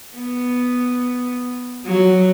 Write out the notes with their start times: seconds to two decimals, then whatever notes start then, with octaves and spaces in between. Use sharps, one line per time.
0.17 B3
1.85 F#3